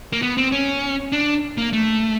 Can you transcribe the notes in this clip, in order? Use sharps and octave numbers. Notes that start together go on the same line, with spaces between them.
A#3
B3
C4
C#4
D4
A#3
A3